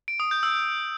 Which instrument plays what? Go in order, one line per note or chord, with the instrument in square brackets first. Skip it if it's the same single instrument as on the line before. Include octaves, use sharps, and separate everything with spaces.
[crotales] D7
D#6
G6
E6